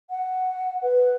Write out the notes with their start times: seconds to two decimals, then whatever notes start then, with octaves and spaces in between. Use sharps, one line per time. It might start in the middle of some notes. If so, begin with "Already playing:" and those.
0.10 F#5
0.82 B4